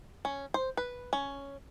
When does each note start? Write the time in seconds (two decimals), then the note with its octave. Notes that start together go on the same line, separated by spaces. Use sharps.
0.25 C#4
0.54 C5
0.77 B4
1.13 C#4